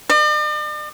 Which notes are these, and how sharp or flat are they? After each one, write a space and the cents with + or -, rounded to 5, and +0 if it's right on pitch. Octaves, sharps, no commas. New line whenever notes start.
D5 +45